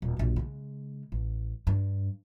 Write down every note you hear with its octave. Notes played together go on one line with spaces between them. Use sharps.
D#1
A#1 F#2
C#3 G#3
A1
G2